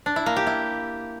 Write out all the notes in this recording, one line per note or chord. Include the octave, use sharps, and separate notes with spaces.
D4
E4
A#3
G4
E4